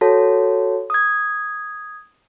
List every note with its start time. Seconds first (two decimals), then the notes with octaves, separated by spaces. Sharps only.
0.01 F#4 A4 C#5 A5
0.90 D#6 G#6